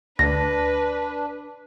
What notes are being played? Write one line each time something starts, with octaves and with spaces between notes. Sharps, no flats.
D2 D4 B4 A#6